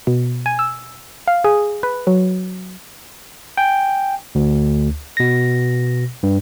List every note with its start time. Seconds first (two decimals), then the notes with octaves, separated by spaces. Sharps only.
0.07 B2
0.46 G#5
0.59 E6
1.27 F5
1.44 G#4
1.83 B4
2.07 F#3
3.57 G5 G#5
4.35 D2
5.17 B2 A#6
6.23 G2